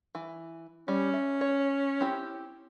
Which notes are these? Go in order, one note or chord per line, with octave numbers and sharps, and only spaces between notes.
E3
G3 C#4
E5
C#5
C4 E4 G4